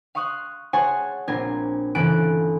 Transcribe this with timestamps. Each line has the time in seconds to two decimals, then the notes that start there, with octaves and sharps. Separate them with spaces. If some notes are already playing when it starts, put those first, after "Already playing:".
0.15 F5 C6 C#6 D#6 F#6
0.73 G#4 C#5 F#5 G#5 A5 C6
1.28 A#1 C4 D4 F4 A#4 G#6
1.95 G1 C#3 E3 A4 F#6 D7